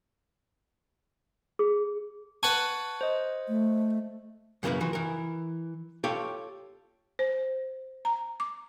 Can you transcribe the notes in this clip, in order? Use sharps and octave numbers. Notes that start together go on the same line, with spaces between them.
G#4
B4 F#5 G#5 A5 C#6
C5 D#5
A3
F#2 C#3 A#3 B3 E4 B4
E3 F3 F#4
E3 A#4
F4 G4 A4 C#5 F5 G5
C5
A#5
D6